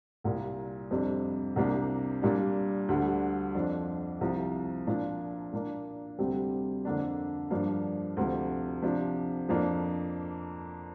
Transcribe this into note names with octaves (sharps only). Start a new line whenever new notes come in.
C2 A#2 G3
F2 C3 G3 D4
C2 C3 A#3 D4
A#2 G3 A#3 D4
D2 D3 G3
F2 F3 D4
C2 C3 F3
A#2 F3 D4
A#2 A#3 D4
D2 C3 G3 C4
F2 D3 A#3 D4
G2 F3 A#3 D4
D2 C3 F3
C3 F3 D4
F2 F3 A#3 D4